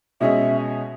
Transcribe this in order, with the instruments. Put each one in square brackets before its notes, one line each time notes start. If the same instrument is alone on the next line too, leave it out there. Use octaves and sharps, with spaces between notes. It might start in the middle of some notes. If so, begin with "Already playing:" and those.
[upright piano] B2 G#3 C#4 G#4 D#5 [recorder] E5